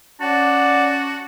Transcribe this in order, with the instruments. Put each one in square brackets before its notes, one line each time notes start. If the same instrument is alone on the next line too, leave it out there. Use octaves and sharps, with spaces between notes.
[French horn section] C#4 [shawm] F#4 [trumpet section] D5 F#5 [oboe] A5